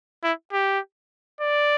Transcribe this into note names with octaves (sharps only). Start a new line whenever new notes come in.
E4
G4
D5